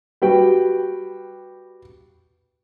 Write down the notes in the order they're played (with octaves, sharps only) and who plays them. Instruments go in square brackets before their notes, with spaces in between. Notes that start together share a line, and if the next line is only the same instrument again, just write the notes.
[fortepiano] G3 F#4 B4 G5